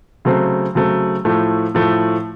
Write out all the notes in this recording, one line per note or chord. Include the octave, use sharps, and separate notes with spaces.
C#3 F#3 A3 C4
C#3 F#3 A3 C4
A2 F3 A3
A2 F3 A3